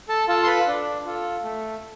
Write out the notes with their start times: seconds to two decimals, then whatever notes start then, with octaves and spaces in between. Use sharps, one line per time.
0.09 A4 A5
0.28 F4 A4 A5
0.43 C6
0.47 B4 B5
0.67 D4
1.06 F4 A4
1.44 A3